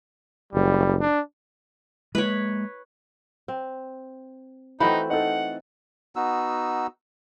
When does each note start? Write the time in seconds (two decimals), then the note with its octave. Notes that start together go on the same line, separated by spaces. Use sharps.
0.53 F#1 G3
1.00 D4
2.15 G#3 A#3 B4 C#5
3.48 C4
4.80 E3 A3 C4 D#4 F#4 C5 B5
5.10 D#4 A4 F#5
6.16 B3 D#4 F#4 E6